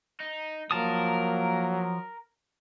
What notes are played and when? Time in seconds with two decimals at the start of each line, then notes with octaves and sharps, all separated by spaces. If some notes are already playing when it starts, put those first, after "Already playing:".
0.20 D#4
0.71 F3 F#3 A#3 A#4 A5 D#6